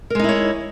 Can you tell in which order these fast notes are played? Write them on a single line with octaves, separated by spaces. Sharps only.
A#4 G#3 D#4 E4 C#5